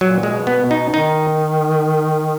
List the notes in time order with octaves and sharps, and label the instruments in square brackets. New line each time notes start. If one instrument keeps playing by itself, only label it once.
[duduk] A#2 [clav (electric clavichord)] F#3
[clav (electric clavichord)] G#3
[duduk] B2
[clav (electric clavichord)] B3
[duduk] B2
[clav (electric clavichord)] D#4
[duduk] D#3 [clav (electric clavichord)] D#4